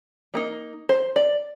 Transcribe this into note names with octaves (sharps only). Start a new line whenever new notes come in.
G3 A#3 D#4
C5
D5